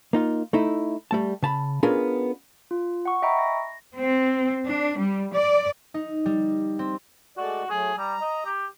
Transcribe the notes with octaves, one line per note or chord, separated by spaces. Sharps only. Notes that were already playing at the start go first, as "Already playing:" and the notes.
A#3 D#4 F4
A3 D#4 E4
G3 A3 A5
C#3 A5 B5
B3 C#4 D4 F4 G#4 A#4
F4
F#5 C#6
D#5 E5 G5 A#5 B5 C#6
A#6
C4
D4
G3
D5
D#4
G3
C4
G#3 A3 F#4 D5
F#3 A3 G#4
G3 A#5
D#5
G4